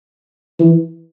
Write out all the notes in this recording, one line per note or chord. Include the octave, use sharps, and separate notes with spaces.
E3